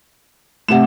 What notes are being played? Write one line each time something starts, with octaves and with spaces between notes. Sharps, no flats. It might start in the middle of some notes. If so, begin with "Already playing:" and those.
C3 A3 F#5 E7